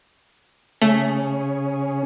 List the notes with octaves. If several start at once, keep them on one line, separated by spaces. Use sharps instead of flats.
C#3 A3 C#4 G#4